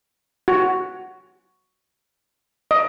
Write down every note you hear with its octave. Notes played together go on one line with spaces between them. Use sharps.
F#4
D#5